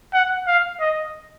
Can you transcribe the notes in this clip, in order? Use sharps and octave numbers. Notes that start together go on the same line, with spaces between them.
F#5
F5
D#5